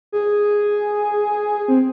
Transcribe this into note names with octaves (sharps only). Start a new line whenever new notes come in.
G#4
C4